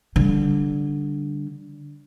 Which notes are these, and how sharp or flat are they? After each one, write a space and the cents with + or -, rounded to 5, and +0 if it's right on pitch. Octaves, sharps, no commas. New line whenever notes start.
D3 -5 G3 +0